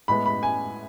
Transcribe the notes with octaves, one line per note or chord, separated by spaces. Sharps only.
A2 G#3 B3 B5
B5
G#5